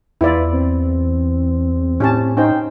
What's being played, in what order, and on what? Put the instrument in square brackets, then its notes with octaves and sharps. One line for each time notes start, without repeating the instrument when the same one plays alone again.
[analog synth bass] E2 [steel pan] E4 F4 D5 [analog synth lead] B4
[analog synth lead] C4
[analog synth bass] A2 [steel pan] C#4 G4 A5
[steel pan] C#4 D#4 C5 [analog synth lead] G5